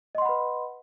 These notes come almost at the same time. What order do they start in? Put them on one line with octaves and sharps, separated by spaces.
D#5 C6 F#5 B5 B4